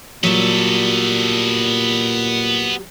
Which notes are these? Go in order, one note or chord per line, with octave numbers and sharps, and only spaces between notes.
A#2 F#3 G3 B3 A4